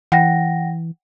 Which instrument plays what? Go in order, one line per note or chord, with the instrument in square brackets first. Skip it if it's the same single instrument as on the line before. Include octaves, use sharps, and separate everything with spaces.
[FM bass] E3 [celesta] F#5 G5 A#6